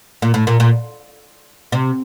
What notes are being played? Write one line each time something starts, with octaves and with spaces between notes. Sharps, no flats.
A#2
A2
A#2
A#2
C3